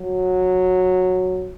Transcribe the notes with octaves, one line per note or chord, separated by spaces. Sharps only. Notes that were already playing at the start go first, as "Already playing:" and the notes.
Already playing: F#3